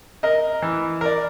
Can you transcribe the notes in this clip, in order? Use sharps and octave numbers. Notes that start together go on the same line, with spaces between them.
A#4 D#5
E3
A#4 D5